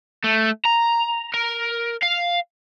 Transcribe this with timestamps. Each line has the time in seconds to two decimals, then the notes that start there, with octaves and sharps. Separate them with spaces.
0.24 A3
0.65 A#5
1.34 A#4
2.02 F5